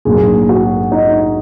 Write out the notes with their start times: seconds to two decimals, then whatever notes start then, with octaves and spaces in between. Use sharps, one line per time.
0.05 A#1 G#2 F#3 A#3 G#4
0.49 F#4
0.92 D#4